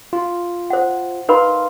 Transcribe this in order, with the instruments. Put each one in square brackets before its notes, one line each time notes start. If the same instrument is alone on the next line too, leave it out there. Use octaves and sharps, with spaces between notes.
[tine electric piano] F4
[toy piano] C5 F#5
[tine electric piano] D#4 F5 C6 [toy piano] A#4 B4 B5